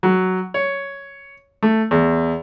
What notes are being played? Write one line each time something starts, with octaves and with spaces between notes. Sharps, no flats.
F#3
C#5
A3
E2